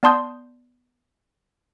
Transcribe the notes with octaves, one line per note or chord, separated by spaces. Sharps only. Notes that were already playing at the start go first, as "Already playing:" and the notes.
B3 D5 A5 C6 D#6 G6